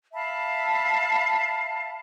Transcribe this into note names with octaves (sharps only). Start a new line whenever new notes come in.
E5 F5 A5 B5